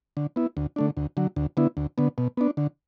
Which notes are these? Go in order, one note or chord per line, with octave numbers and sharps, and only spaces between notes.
D3
B3 E4
D2
D3 A3 D4
D2
D3 F#3
D2
D3 B3 E4
D2
D3 B3
B2
B3 D4
D3